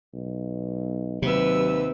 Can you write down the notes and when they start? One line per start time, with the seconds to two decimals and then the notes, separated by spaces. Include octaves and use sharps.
0.14 B1
1.22 D#2 C3 F#3 B4 E6